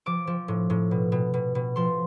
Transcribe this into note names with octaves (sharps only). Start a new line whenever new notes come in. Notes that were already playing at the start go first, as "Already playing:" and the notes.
F3 D6
F3
A2
A2
B2
B2
B2
B2
F3 C6